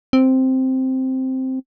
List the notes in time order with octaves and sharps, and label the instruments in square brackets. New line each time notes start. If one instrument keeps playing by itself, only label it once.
[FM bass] C4